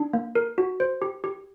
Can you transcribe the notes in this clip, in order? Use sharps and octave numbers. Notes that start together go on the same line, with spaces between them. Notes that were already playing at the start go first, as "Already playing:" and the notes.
Already playing: D4
A#3
A#4
F#4
C5
G4
G4